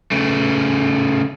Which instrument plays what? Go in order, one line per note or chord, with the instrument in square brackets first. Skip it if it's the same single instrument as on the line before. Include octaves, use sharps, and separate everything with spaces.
[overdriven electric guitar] C#3 A3